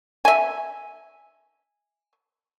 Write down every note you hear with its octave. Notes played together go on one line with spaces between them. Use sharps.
E5 G#5